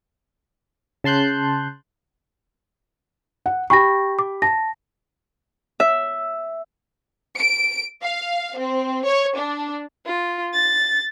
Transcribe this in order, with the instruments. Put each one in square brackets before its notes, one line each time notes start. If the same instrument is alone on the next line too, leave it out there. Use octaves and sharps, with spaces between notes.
[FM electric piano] C#3 A5 C6 F#6 G6
[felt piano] F#5
[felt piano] G4 G5 B5 [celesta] C#6 A#6
[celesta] D6
[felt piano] A5 [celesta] A#6
[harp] E5
[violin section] D7
F5
C4
C#5
D4
[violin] F4
A6